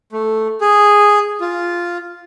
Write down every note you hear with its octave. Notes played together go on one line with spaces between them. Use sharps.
A3
G#4
F4